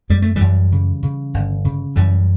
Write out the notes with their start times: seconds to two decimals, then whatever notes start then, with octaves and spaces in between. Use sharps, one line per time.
0.10 F#2 G3
0.22 A3
0.36 F#2 E3 G3
0.72 C#3
1.03 C#3
1.34 G1
1.65 C#3
1.96 F#2 E3 G3